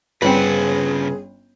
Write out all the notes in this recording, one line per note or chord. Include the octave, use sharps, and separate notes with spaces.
G1 C#3 C4 C#4 G#4 B4 F#5 G5